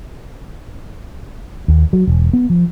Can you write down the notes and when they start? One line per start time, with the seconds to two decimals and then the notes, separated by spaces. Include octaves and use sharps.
1.68 D#2
1.93 F#3
2.07 E1
2.33 B3
2.50 F3